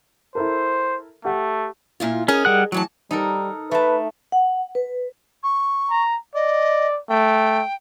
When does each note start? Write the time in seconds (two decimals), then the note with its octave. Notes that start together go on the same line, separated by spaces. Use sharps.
0.35 E4 A4 A#4 C5
1.25 A3 G4 F#5
2.00 A#2 E4 F4
2.28 C#4 G#4 A#4 D#5
2.45 G3 F#5 F#6
2.72 A2 E3 F#3 A5
3.11 G3 D#4 A4 A#4
3.71 A3 B4 A5
4.32 F#5
4.75 B4
5.43 C#6
5.90 A#5
6.35 D5 D#5
7.09 A3 G5